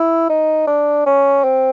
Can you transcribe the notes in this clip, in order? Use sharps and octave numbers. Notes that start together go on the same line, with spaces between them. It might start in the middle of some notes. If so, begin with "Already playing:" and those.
Already playing: E4
D#4
D4
C#4
C4